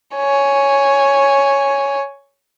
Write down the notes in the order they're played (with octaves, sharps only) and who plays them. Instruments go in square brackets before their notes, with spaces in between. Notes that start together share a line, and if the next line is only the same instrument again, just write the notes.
[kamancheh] C#5 G#5